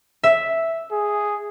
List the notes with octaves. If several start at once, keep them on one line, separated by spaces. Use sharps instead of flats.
E5
G#4